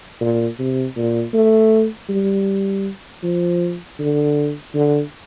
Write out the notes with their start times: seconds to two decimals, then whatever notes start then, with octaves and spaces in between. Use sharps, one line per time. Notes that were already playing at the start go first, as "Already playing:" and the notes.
0.21 A#2
0.59 C3
0.97 A#2
1.34 A3
2.09 G3
3.23 F3
3.99 D3
4.74 D3